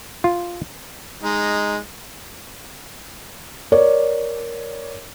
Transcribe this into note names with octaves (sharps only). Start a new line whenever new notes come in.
F4
G#3 D#4
A#4 C#5 D5